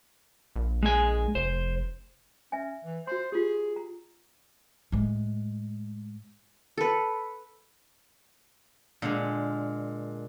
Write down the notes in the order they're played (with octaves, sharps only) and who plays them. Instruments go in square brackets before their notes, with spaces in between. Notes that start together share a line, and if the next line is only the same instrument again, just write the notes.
[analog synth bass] A#1
[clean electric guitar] G#3 G#5
[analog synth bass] F1 [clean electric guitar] C5
[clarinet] C#4 [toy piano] E5 G#5
[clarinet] E3
[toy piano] F#4 C6 [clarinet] C5
[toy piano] F4 G4 [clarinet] G#4
[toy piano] A#5
[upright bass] A2 G#3
[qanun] A4 B4
[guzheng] A#2 D3 G#3